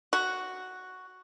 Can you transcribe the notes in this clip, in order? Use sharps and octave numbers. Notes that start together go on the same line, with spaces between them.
F#4